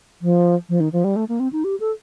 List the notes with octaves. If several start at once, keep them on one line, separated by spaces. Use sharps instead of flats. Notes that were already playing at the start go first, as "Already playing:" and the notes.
F3
F3
D#3
F3
G3
A3
A#3
C4
D#4
G4
A4